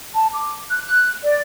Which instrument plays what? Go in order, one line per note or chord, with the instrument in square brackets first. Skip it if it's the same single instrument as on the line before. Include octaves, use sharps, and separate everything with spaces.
[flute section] A5
D6
F#6
F#6
D5